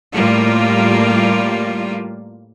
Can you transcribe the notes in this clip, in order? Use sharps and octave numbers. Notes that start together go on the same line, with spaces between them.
A2 G3 A#3 F4